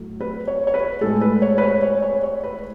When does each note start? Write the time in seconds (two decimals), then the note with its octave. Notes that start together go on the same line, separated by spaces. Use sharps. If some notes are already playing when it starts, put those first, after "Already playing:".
Already playing: A2 F#3 A3
0.21 B4
0.48 C#5
0.67 C#5
0.74 B4
1.01 A2 G#3 A4
1.21 B4
1.42 C#5
1.58 B4
1.62 C#5
1.82 C#5
2.02 C#5
2.23 C#5
2.44 B4